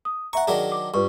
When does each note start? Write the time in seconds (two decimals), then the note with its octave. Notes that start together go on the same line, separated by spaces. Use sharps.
0.05 D#6
0.33 E5 F#5 A#5 C#6
0.47 D#3 F#3 D4 G#4
0.72 D6
0.94 G2 F4 B4 C#6